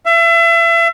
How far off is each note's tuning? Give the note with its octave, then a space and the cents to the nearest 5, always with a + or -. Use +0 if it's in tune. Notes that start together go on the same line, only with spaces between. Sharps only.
E5 +35